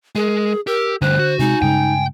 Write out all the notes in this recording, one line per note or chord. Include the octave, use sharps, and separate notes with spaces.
G#3 G#4 A#4
G4 A#4 E6
D2 G2 D3 C5 F#6
F#4
C3 G3 G#3 D#4 G#5
G2 C#3 G#3 G5